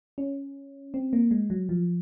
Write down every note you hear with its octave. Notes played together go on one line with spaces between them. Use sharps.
C#4
C4
A#3
G#3
F#3
F3